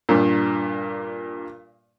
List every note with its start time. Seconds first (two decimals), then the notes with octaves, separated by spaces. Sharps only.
0.09 G2 A#2